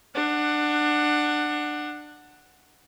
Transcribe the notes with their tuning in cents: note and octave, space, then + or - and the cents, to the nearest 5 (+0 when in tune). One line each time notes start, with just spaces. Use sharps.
D4 +25 F#5 +0